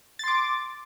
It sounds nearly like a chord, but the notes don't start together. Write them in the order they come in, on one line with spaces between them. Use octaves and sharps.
A6 C6 D6